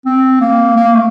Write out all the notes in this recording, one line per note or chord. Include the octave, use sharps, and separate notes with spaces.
C4
A#3
A#3
A3